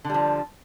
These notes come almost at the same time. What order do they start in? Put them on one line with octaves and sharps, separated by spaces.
D3 G3 F3